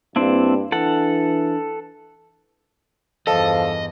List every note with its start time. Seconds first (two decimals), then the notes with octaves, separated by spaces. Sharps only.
0.16 G2 A#3 C4 D4 E4
0.72 E3 D4 A4 F#5
3.27 E2 G2 F3 A4 D#5 A5